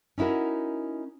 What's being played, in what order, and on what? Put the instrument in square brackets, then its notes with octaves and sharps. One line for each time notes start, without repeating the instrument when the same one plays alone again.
[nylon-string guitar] C#4 D#4 E4 F#4 A#4